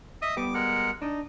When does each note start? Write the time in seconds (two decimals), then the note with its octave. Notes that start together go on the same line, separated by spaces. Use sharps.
0.22 D#5 E5 D#6
0.37 G3 B3 D6
0.54 G#3 A#4 F#5
1.02 D4 D#4